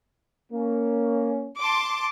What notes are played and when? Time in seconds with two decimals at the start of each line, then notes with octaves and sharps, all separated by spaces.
0.52 A#3 C#4
1.58 A5 C6 D6